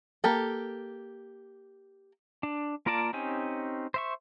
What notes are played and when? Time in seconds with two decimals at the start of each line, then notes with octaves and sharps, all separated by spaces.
0.24 A#3 G4 A4
2.43 D4
2.86 A#3 F4 A#4 D5 A5
3.13 C4 C#4 D#4 G4 G#5
3.94 C5 E5 C#6